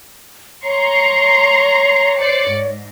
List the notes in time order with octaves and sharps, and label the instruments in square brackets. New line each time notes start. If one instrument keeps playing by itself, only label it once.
[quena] C#5 [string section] A#5 C6 C#6
[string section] C5 D5 C#7
G#2